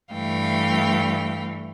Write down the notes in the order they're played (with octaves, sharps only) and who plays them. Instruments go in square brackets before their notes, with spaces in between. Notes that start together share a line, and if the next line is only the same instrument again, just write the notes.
[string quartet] G2 E3 A3 F5 G5